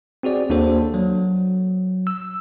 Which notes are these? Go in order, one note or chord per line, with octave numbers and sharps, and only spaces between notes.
C4 F#4 G#4 D5
D#2 A#3 D4 F#4 A4 C5
F#3
E6